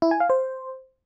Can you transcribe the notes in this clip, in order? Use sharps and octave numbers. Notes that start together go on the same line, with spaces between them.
E4
G#5
F5
C5